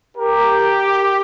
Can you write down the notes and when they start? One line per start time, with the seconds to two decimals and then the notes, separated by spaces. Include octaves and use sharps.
0.17 G4 A#4